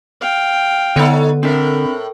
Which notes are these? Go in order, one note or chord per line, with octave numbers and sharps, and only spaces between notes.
F5 G5
D3 B3 D#4 A4 C#5
A2 C4 D4 A#4 E5